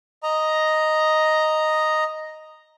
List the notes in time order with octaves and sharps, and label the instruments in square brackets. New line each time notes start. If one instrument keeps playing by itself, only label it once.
[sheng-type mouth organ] D#5 A#5